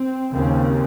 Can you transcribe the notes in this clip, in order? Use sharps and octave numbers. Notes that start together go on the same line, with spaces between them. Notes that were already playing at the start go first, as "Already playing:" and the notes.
Already playing: C4
D#2 C#3 C4